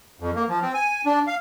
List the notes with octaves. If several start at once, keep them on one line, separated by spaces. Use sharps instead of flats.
F2
A#3
F3
C4
G#5
D4
F5